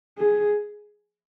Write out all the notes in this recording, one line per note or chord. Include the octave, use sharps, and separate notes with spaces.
G#4